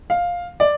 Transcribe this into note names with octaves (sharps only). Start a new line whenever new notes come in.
F5
D5